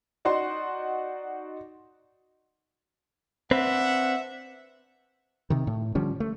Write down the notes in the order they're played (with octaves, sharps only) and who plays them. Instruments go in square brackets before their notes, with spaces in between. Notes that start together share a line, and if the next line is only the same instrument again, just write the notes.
[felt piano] D#4 F#4 D5 F#5 C6
[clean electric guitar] C4 B4 [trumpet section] D4 E5 F#5
[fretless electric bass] C3 D#3
A2
D3 F3 G3 C#4
A3